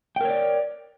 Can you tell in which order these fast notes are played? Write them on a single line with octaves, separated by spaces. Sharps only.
G5 A#4 C#5 D5